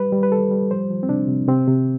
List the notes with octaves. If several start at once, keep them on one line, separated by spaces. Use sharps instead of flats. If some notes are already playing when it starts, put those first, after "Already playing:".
Already playing: G3 B4
G3
B4
G3 A4
G3
F3 C5
F3
C4
C3 D4
C3
C3 C4
C3